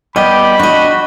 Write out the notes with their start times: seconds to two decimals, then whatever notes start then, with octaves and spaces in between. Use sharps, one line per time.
0.16 G3 B3 G4 D#5 B5
0.59 D4 F#4 D#5